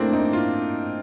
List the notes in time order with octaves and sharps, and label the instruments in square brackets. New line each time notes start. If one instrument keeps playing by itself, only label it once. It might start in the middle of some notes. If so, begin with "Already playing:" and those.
Already playing: [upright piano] A2 A3 [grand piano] A#3 C4 D4
[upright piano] A3 [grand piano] D#4
[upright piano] A2 [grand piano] F4